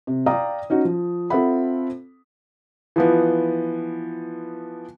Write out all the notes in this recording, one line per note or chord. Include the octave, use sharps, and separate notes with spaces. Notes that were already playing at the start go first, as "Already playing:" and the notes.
C3
D5 F5 G5 A#5 D#6
C#4 D#4 F#4
F3
C4 F4 A4 E5 F#5 B5
E3 F3 B3